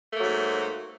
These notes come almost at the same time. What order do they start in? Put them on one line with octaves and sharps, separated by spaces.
A3 A#3 F#3 G#2